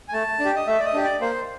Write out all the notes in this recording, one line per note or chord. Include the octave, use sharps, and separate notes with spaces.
G#5
A3 A5
D4
G4
D#5
A3 E5
D5
D#5
D4 G4
D5
A#3 C5